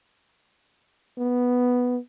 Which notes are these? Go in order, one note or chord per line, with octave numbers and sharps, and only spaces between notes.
B3